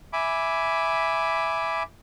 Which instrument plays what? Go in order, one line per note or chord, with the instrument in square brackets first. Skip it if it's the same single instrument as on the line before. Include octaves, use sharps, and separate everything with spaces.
[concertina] E5 G#5 B5 D6